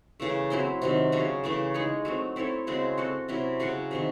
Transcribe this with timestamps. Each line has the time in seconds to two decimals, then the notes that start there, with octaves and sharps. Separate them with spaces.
0.20 C#3 E3 A3
0.50 F#3 C4 E4 C5
0.82 C3 D#3 F#3
1.12 C#3 F#3 C#4
1.44 C#3 E3 A3
1.74 G#3 D#4 G#4 C#5
2.05 F#3 A3 C4
2.36 C4 E4 A4 C#5
2.67 C#3 G#3 C4 F#4
2.98 C4 F#4 A4
3.29 C3 F#3 C#4 E4
3.60 C#3 F#3 C#4 F#4
3.91 C3 D#3 F#3